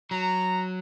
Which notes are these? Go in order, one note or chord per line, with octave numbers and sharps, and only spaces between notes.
F#3 A#5